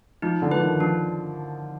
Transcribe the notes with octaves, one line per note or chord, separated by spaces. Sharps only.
F3 D#4
D3
F3 B4
D#3
F3 D4